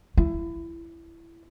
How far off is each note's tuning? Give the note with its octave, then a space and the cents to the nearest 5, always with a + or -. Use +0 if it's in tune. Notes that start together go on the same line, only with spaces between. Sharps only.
E4 +20